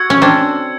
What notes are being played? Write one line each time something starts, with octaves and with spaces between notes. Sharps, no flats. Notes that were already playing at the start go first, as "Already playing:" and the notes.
Already playing: F#4 E6 G#6 C#7
C#4
C4 D4